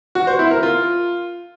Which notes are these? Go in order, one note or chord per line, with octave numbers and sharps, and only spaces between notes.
F#4
C5
E4
A#4
F4